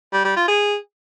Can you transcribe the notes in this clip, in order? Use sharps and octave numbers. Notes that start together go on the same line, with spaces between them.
G3
G3
F4
G#4